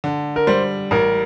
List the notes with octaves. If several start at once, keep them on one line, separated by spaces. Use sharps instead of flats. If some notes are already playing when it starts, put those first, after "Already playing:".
D3
A#4
G3 C5
A1 A#4